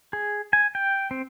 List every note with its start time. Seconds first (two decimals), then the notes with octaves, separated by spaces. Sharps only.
0.13 G#4
0.53 G#5
0.75 G5
1.11 C4